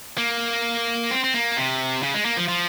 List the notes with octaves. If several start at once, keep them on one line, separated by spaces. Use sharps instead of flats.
A#3
C4
C4
A#3
C3
C#3
G#3
A#3
F3
F3